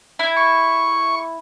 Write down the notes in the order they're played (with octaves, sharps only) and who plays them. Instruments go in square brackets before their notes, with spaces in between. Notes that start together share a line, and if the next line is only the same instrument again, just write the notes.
[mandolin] E4
[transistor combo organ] C#6